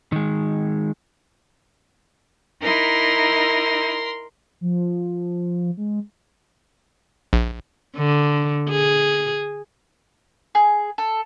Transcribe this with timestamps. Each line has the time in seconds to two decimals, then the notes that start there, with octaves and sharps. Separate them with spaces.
0.12 D#3 G#3
2.62 D#4 E4 A#4 C6
4.61 F3
5.77 G#3
7.33 A#1
7.97 D3
8.70 G#4
10.55 G#4
10.98 A4